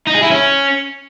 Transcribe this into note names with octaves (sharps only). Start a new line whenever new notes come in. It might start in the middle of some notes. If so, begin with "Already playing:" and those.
D#4
G#4
E4
C#4